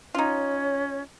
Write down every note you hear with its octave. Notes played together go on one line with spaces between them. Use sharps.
C#4 D#4 F4 C#5